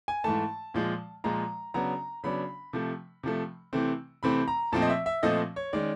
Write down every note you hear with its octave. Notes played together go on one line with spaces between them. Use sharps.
G#5
G#2 E3 A3 A5
A#2 F3 G#3
A#2 F3 G#3 A#5
C#3 F#3 B3 D4 A#5
C#3 F#3 B3 D4 B5
C3 F3 A3
C3 F3 A3
C3 E3 A3 C4
C3 E3 A3 C4 B5
A#5
A#2 F3 A3 C4 A5
D#5
E5
E5
A#2 F3 A3 C4 D#5
C#5
D#3 G#3 C#4 D5